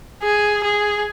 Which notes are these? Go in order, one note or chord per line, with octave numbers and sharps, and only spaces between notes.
G#4
G#4